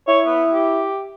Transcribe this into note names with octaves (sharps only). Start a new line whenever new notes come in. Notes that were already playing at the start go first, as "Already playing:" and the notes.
E4 C#5
B3
G4